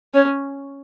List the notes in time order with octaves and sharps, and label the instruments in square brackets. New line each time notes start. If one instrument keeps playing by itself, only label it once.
[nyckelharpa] C#4 [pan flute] C#5